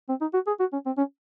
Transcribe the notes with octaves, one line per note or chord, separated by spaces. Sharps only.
C4
D#4
F#4
G#4
F#4
C#4
C4
C#4